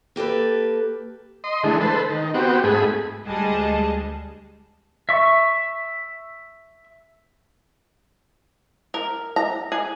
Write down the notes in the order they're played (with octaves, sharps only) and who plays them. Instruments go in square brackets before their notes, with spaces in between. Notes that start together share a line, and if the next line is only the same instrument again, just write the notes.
[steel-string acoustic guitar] A#3 G4 A4 B4
[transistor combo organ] D#5 C6
D3 E3 G#3 A3
A4 B4 C5
D#3
B3 C4 F#4 G4
G#2 A3 G#4 B5
[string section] D2 G3 G#3 G#4 D#5 A5
[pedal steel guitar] E5 C#6
[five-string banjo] A#4
A#5
G#4